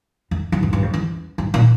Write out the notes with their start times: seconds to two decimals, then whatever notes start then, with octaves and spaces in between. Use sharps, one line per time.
0.31 F2
0.52 G2
0.63 F2
0.73 G2
0.83 F2
0.94 E2
1.38 G2
1.54 A#2